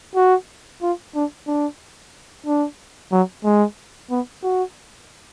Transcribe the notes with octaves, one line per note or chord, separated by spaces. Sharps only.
F#4
F4
D4
D4
D4
F#3
G#3
B3
F#4